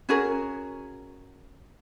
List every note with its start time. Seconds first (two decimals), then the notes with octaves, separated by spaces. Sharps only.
0.09 C#4 F#4 G#4 A#4